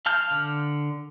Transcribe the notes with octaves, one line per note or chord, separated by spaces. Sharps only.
F5 A5 F6 G6
D3